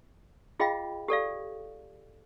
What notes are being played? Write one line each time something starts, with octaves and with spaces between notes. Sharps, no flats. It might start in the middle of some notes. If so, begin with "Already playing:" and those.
F4 G#4 D#5 F5 G5 B5
G4 A4 D5 F5